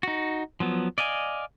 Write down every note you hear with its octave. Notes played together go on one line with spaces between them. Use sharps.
D#4 F#4
F3 F#3 B3
D5 D#5 F5 G#5